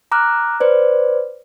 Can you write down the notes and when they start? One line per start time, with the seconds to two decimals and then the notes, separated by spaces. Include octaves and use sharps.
0.12 A#5 D6 F6 F#6
0.60 B4 C5 D5